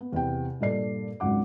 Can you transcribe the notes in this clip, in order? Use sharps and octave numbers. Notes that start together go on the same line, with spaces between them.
B3
E2 C3 G5
G2 A#2 A4 D5 C7
G#1 C#2 F#3 F#5 D6